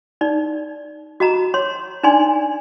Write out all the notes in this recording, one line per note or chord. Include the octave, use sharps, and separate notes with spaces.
D#4 D5
F#4 D#5 A#5 B5
C#5 C6
D4 D#4 D5 G#5 C6